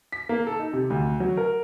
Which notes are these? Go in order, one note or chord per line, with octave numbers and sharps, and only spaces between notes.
B6
A#3
A4
D#4
C3
D2
F#3
A#4